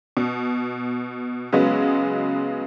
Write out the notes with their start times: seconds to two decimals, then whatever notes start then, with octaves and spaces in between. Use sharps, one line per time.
0.17 B2
1.53 C#3 F#3 G#3 B3